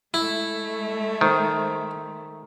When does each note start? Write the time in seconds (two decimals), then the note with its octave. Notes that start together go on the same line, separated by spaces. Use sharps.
0.14 G#3 A3 E4
1.21 D#3 C5